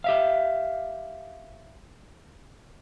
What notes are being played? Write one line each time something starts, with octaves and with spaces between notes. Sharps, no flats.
G4 E5 F5